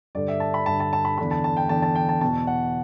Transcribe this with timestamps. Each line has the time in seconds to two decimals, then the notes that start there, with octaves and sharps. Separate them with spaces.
0.15 G2 D3 D5
0.28 E5
0.40 A5
0.54 B5
0.66 G2 D3 A5
0.80 A5
0.93 A5
1.05 B5
1.18 E2 D3 B5
1.31 A5
1.44 A5
1.57 G5
1.69 E2 D3 A5
1.82 A5
1.95 G5
2.09 A5
2.21 E2 B2 A5
2.47 F#5